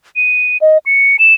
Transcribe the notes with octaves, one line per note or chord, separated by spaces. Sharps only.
D#7
D#5
C#7
E7